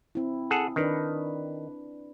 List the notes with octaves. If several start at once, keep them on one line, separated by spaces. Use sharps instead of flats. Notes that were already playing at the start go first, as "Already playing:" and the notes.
C4 E4
G#4 A4 F#5
D#3 D4 B4 D5